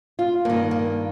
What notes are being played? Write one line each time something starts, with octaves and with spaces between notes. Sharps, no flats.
F4
G2 D#3 A#3
A#3